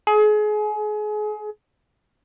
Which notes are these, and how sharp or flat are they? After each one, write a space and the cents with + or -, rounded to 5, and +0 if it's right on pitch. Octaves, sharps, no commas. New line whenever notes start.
G#4 +30